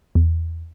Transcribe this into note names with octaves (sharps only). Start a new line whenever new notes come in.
E2